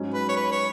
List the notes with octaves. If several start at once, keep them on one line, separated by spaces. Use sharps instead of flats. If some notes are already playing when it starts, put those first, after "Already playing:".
Already playing: G#2 F#3 C#4
B4
C#5
B4
C#5